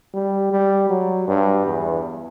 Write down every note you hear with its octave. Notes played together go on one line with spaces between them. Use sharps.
G3
G3
F#3
G2
E2